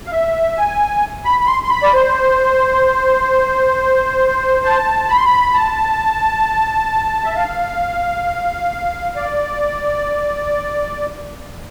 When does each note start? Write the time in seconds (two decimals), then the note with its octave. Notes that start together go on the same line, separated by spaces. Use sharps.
0.06 F5
0.12 E5
0.57 G#5
1.25 B5
1.41 B5
1.47 C6
1.64 C6
1.70 B5
1.83 D5
1.93 C5
4.64 A5
5.09 B5
5.17 C6
5.25 B5
5.54 A5
7.24 E5
7.35 F5
9.16 D5